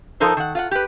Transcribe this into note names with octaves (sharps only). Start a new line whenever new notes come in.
F3 D#4 A4 A#4 C5
D#3 F#5
F4 F5 F#5
G4 B4